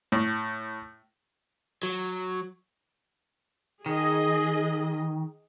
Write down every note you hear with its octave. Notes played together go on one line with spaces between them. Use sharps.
A2
F#3
D#3 G#4 D#5